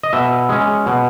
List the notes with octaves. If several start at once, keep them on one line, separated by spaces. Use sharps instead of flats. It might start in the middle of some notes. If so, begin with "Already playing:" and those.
D#5
B2 E5
G#3 C#4
B2